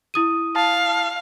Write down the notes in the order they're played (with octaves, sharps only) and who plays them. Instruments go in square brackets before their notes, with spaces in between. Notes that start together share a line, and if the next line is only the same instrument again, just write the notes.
[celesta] E4 D#6 D#7
[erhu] F5 [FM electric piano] A5